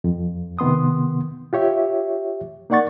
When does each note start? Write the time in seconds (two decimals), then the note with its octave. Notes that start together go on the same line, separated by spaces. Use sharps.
0.04 F2
0.59 C3 D#3 B3 C6 D#6
1.53 F4 G4 C#5 E5
2.70 A#3 D#4 D5 F#5 C#6 A6